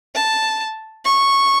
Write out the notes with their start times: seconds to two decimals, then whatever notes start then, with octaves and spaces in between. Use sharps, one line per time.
0.15 A5
1.05 C#6